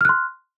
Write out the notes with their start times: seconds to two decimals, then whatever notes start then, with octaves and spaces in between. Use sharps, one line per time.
0.01 F6
0.05 F#6
0.09 C6